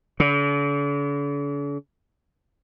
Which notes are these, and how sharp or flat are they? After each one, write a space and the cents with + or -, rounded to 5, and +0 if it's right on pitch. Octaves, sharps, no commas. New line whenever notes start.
D3 -45